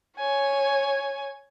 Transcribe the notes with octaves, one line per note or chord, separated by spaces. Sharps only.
C#5 G#5